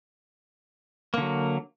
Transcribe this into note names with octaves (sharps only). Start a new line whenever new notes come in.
D3 F#3 A#3